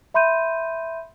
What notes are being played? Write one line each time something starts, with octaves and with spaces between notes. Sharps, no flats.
E5 B5 C6 G6 D#7